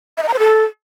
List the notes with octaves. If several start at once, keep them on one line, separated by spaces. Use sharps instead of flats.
E5
D#5
A#5
C5
A4